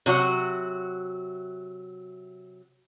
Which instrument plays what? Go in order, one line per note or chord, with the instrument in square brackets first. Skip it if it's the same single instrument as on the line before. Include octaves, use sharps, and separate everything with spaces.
[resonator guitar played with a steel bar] C3 F#3 F#4